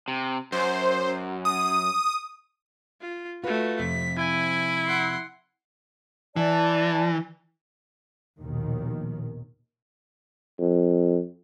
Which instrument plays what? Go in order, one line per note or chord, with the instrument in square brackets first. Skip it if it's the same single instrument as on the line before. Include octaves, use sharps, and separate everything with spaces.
[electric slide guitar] C3
[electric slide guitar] F#2 [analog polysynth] C5
[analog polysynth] D#6
[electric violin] F4
[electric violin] A3 F#4 [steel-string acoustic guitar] F4 B4
[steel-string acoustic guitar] F2 C3 [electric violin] B6
[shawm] E4 [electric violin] G#5
[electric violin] F#5 C6
[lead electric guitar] E3 [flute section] D5 A5
[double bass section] A#1 D#2 B2 D#3
[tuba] F2